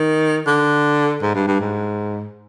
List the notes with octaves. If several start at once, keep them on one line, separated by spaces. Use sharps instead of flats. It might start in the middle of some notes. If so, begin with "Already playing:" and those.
Already playing: D#3
D3
G#2
G2
G2
G#2